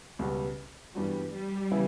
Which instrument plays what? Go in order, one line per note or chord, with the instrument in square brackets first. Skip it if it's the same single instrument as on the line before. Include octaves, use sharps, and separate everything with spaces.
[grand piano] C#2 B2 G3 B3
[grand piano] G2 E3 B3 D4 F#4 [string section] G3
[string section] G3
[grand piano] C#3 E3 B3 E4